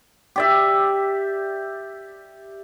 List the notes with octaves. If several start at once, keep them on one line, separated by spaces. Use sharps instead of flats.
G4 D5 E5